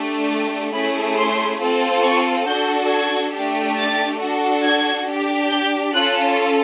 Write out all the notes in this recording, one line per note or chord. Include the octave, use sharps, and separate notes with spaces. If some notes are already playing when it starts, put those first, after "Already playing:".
Already playing: A3 D4 G4
A3 C#4 E4 G#4 B5
C6
C4 F4 A4
C#6
D4 F#4 A4 G6
G#6
A3 D4 G4
A6
D4 F#4 A4
G#6
D4 G4
G6
C#4 F4 A4 F#6